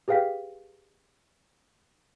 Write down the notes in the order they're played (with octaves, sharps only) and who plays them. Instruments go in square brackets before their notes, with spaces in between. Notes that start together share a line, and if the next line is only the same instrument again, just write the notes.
[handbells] G4 G#4 B4 F5 G5 B6